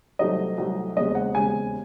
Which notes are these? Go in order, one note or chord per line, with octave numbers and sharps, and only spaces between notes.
C2 C3 D#3 F#3 A3 D#5
C2 C3 D#3 F#3 A3
E1 D#2 C#3 G#3 C4 D#5
F#5
E1 D#2 C#3 G#3 C4 G#5